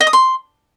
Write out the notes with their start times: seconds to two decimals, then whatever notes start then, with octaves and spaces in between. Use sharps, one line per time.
0.01 D#5
0.07 D#6
0.13 C6